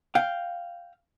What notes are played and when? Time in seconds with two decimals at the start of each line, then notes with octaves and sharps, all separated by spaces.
0.15 F5 G5